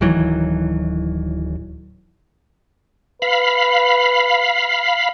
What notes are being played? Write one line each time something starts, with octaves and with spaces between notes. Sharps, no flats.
D1 D#3 E3 F#3
B4 F5 B5